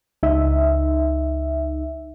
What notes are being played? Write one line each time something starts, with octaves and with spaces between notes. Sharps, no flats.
C#2 D#4 E5